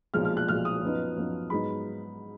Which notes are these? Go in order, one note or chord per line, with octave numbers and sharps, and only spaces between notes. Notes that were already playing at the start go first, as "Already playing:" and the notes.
B1 A#2 F3 G#3 F6
F6
F#6
B1 A#2 F3 G#3 F6
D#6
F#2 F3 B3 D#4
F#2 F3 B3 D#4
G#2 F#3 B3 D#4 B5